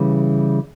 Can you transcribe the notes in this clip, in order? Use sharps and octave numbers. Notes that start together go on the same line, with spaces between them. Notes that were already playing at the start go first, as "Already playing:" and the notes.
Already playing: C#3 E3 G3